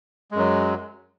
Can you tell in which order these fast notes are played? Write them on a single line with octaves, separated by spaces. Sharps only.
G#3 F#2 F#3